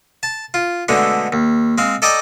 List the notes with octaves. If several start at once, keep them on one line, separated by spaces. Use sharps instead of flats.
A5
F4
B2 D3 G#3 A3 D4
D#2
G#3 C4 F5
A4 D5 D#5 G5 A#5 D6